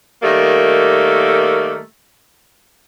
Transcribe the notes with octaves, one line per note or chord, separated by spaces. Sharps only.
D#3 G3 A3 A#3